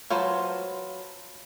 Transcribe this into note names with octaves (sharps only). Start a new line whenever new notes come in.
F#3 F4 B4 C5 A5